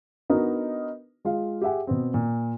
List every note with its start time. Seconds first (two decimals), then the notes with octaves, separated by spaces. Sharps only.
0.30 B3 D4 D#4 F#4 A#4
1.25 G#3 F4 F5
1.62 G4 G#4 E5 F#5 G#5
1.87 B2 B3 C4
2.14 A#2